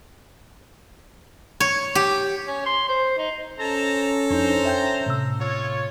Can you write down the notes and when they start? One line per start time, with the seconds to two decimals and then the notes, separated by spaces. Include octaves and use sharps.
1.60 C#5
1.95 G4
2.47 C#4
2.66 C6
2.89 C5
3.18 D#4
3.59 C#4 A4 C5 A5 A#5
4.30 F2 D4 D#4 C5 A#5
4.65 E5 G5 G6
5.06 A2 C3 E6
5.39 F4 C#5